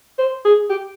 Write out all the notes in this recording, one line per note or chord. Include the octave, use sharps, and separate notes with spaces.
C5
G#4
G4